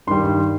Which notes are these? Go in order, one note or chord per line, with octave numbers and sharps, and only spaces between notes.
G2 D#3 G3 C6